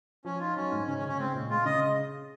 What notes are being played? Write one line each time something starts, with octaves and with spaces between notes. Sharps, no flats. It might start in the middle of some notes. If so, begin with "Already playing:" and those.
F3 C#4
D#4 F4
F#3 C#4
G#2
C#3 C#4
C#4
C#3
C#4
G#3 C4
A#2
G#3 F4
C#3 D#5